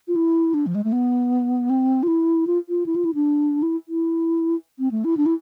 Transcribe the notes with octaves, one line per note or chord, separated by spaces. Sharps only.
F4
E4
D4
F3
G#3
A3
B3
C4
F4
E4
F4
F4
E4
F4
E4
D4
E4
E4
C4
A3
E4
D4
E4